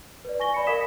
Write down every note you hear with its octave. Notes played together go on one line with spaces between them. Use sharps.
B4 D5
G#5 C#6 A#6 G7
D5 B5 C#7
A#4 D#5 F5 D#6 B6 E7